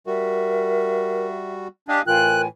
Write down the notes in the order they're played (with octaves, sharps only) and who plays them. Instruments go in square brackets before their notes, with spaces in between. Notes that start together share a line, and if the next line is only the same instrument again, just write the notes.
[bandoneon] G3 F#4 [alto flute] A#4 [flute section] E5
[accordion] D4 G4 [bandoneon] D#5 F5 G#5
[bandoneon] A2 E3 [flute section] F4 G5 G#5 [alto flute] A#4 [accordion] F#6